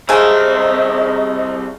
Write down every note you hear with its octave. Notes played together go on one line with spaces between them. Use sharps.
C2 A3 G#4 C5 D#5 G#5 A#5 F6